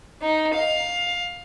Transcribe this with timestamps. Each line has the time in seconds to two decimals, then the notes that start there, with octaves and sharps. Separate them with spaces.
0.22 D#4
0.54 F5